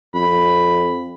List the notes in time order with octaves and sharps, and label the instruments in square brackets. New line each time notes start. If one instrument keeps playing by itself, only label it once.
[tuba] F2 [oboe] B5